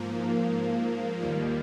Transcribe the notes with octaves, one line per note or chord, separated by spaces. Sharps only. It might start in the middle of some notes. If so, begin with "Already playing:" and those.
Already playing: G#2 F3 A#3
D#2 D#3 G3 A#3